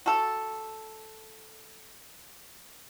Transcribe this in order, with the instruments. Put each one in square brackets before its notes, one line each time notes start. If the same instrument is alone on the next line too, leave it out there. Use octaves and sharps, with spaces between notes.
[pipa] F#4 A4